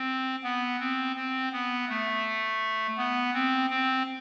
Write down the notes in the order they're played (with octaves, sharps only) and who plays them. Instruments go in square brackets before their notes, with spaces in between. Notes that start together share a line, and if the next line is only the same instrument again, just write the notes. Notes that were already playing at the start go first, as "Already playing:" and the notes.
Already playing: [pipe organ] C4
B3
C4
C4
B3
A3
B3
C4
C4